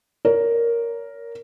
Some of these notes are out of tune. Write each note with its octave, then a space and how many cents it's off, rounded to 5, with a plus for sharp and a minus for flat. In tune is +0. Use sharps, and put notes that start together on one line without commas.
A#4 +0 C#5 +30